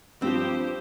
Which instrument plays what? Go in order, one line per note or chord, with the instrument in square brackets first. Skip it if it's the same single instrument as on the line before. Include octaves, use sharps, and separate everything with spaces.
[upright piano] G2 F3 [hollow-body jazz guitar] C4 [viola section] G4 C5